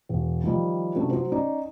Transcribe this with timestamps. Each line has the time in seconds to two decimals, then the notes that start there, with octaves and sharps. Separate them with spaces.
0.09 E1
0.44 D#3 F3 G3
0.95 C3 F#3 A3 C#4 D4
1.09 F#3 C5
1.32 C#4 D#4 D5